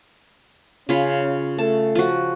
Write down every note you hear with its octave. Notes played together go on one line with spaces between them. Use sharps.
C#3 C#4 F4 B5
A3 A5
F3 F#4